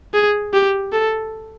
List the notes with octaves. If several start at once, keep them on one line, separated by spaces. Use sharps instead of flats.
G#4
G4
A4